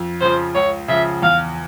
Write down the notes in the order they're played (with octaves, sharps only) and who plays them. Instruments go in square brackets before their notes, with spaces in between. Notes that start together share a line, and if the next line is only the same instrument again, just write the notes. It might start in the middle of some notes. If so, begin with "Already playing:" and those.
Already playing: [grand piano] F2
[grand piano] C#3 F3 [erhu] C5
[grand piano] C#2 [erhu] C#5
[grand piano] C#3 F3 [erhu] E5
[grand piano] E2 [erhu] F5